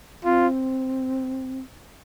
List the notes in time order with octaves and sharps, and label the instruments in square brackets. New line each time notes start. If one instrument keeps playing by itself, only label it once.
[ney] C4 [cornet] F4